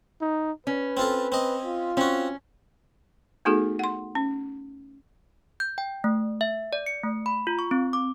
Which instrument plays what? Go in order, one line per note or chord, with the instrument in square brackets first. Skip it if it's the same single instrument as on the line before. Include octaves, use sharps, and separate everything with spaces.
[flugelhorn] D#4
[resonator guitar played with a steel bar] C#4 [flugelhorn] B4
[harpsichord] C4 F4 A4
C4 D#5
[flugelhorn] F4
[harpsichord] C4 F#4 [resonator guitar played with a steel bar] C#4
[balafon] A3 B3 D#4 F#4 G#4 A4
F#5 C6
C#4
[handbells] G6
G5
A3
E5
D5
C#7
A3
B5
F4
C#6
C4
D6